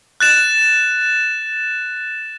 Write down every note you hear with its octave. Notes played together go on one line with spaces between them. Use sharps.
F#6 A6 E7